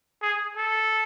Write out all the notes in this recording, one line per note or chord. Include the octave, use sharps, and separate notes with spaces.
G#4
A4